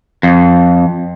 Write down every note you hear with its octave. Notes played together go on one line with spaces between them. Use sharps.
F2